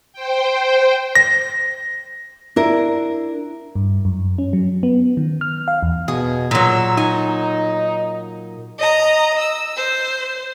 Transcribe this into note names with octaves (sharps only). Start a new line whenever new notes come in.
C5 G5
A#6
D4 E4 A#4
G2
F#2
C#4
F#3
B3
D#3
F6
F5
E2
B2 G#4
A#2 F#3 E6
D#4 G#5
D#5 A#5
E6
C5